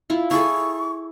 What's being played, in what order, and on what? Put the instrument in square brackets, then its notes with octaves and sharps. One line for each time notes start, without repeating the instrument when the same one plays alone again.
[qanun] E4 F4
[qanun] E4 G#4 A4 [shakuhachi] C#6